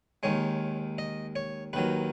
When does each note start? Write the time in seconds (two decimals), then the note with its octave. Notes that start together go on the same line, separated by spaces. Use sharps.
0.23 D#2 D#3 G#3 C#5
0.98 D#5
1.36 C#5
1.73 D#2 D#3 F#3 B4